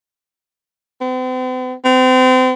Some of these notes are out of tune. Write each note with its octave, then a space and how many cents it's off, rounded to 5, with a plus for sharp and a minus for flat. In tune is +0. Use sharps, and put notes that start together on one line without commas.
C4 -45
C4 -35